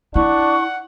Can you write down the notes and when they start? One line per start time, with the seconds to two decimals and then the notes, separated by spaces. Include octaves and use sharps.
0.16 D4 E4 F#5 C#6